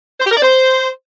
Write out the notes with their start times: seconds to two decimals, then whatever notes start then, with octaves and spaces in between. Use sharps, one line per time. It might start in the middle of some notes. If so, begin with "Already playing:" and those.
0.20 C5
0.25 G4
0.30 A#4
0.36 D5
0.41 C5